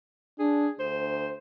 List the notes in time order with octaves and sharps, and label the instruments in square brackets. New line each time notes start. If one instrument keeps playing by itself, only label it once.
[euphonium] D4 [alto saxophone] G#4
[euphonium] D2 [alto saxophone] C5